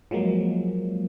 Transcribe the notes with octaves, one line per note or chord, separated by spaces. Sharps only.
F3 F#3 G#3 A#3